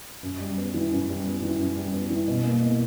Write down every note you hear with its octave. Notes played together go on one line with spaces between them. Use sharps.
F#2
G3
B3
E3
F#2
G3
B3
E3
F#2
G3
B3
E3
B2
A#3
B2